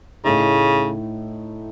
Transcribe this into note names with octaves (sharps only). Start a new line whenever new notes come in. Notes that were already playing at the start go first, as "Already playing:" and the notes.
A2 C#3 A3 D#4